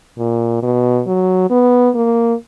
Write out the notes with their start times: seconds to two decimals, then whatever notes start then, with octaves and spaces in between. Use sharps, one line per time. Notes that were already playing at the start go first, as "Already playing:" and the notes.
0.18 A#2
0.62 B2
1.07 F#3
1.50 B3
1.95 A#3